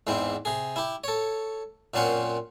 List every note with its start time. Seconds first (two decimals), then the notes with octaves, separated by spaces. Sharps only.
0.07 E2 G#2 E3 C4
0.45 C3 G#4
0.76 E4 G4
1.04 A4 C#5
1.94 F#2 A#2 C4 C#4 C5 F#5